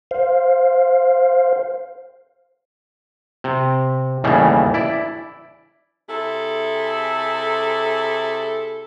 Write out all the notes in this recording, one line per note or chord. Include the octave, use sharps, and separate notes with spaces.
C5 F5
C3
D#2 A2 C#3 E3 G3
E4 D5
C3 E4 G#4 A4